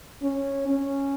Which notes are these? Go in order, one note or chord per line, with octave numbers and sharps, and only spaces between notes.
C#4
C#4